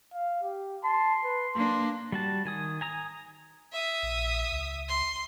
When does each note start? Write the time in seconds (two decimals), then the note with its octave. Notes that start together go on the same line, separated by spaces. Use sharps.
0.14 F5
0.43 G4
0.84 A5 C6
1.24 B4
1.55 A#3 D4 C6
2.12 G3 F#4 A5
2.45 D#3 G#5 D#6
2.81 G#5 A#5 D#6
3.72 E5 D#6
4.03 A#1
4.52 C#2
4.88 C6